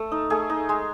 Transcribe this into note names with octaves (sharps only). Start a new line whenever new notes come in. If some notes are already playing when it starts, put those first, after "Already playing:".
Already playing: A3 A4
D#4
A3 G#4
D#4
G#3